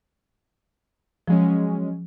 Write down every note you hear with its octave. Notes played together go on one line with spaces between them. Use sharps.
F3 F#3 G#3 C#4